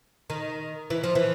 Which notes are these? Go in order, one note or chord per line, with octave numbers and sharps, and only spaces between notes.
D#3
E3
F3
E3